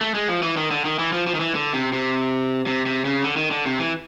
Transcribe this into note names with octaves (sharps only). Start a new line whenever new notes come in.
A3
G#3
F3
E3
D#3
D3
D#3
E3
F3
F3
D#3
E3
D3
C3
C3
C3
C3
C#3
D3
D#3
D3
C3
E3